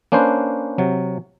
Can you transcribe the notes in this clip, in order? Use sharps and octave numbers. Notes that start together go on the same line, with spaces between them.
A#3 C#4 D4 B4 C5
C3 F#3